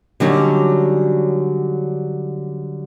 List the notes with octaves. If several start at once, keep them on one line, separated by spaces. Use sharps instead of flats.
D3 F#3 G3 C#4 D#4